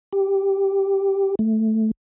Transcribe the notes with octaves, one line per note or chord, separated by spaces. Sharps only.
G4
A3